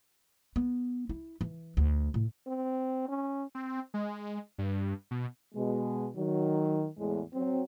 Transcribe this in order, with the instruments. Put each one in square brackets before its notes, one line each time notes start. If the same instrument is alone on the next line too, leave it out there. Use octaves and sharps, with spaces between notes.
[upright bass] B3
E4
E3
D2
A2
[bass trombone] C4
C#4
[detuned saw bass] C4
G#3
G2
B2
[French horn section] B2 G#3
D#3 F#3
E2 A2 G#3
F#3 C4